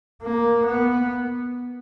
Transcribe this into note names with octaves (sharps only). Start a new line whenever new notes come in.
A#3
B3